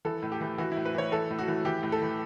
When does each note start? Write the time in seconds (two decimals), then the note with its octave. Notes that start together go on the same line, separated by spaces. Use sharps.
0.05 E3 A4
0.22 A2
0.32 G4
0.41 E3
0.58 E3 F#4
0.72 A2 E4
0.85 B4
0.95 E3 C#5
1.12 E3 A4
1.30 A2
1.39 F#4
1.48 E3
1.65 E3 G4
1.83 A2
1.92 A4
2.02 E3